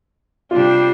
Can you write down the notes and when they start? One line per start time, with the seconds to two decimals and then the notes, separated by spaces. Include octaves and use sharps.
0.51 C3 G3 D4 F4 G4 C5